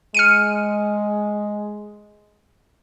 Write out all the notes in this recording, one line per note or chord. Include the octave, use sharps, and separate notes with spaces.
G#3 F6 C#7 D#7